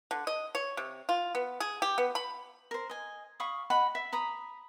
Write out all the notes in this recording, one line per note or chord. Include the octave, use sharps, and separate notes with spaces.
D3
D#5
C#5
C3
F4
B3
G#4
G4
B3
B5
A#4 C5
D#5 G#5
F5 B5 C#6 D#6
D#5 F#5 B5
E5
A#5 B5 D#6